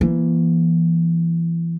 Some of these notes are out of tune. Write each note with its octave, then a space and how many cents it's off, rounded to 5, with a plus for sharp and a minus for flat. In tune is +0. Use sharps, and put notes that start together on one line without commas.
E3 +25 A#3 +45